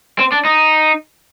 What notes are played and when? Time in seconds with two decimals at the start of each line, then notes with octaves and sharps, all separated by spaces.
0.19 C4
0.32 D4
0.45 D#4